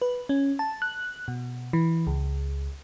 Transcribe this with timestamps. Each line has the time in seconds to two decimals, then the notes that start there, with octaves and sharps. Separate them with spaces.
0.02 B4
0.29 C#4
0.59 A5
0.82 F#6
1.28 B2
1.73 E3
2.07 C#2